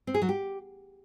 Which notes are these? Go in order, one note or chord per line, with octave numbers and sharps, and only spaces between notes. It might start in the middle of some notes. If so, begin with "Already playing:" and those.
C4
G#4
F#3
G4